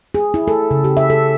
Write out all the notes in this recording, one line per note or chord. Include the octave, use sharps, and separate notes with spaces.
G#4
E4
A4
C#3
G4
E5
A4